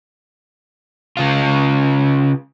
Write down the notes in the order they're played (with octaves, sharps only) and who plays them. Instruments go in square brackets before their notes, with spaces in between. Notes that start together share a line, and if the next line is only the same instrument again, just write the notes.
[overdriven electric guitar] C#3 F4